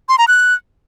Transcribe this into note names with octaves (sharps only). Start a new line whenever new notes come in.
C6
A#5
F#6